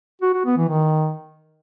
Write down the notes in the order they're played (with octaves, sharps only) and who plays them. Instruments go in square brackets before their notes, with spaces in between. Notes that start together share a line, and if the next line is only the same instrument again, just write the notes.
[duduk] F#4
F#4
B3
E3
D#3